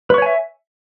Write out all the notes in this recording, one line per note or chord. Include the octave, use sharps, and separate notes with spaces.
B4 C#5 E5 G#5 C#6